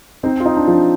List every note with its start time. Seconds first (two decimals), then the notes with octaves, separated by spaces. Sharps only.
0.23 C4 D#4
0.40 F4
0.45 D#4
0.57 D4
0.67 F3
0.73 D4